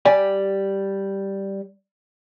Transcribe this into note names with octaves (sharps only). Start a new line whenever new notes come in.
G3 G4 D5 G#5